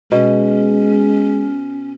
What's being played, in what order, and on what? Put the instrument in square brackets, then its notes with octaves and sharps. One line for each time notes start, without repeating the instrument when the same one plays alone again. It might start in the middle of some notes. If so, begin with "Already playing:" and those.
[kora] B2 [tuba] G#3 [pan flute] C#4